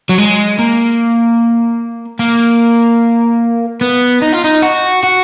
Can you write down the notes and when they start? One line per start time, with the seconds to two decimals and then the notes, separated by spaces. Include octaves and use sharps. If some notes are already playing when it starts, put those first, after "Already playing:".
0.09 F#3
0.18 G#3
0.59 A#3
2.19 A#3
3.81 B3
4.22 D#4
4.33 F4
4.44 D#4
4.62 F#4
5.03 F#4